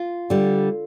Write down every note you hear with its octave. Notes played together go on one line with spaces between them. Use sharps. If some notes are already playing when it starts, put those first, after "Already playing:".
Already playing: F4
D3 G3